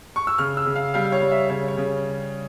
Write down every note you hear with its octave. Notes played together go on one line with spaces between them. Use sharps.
C#6
E6
C#3 F6
E6
C#3
F5
G3 F5
C#5
G3
E5
C#3 C#5
C#5
C#3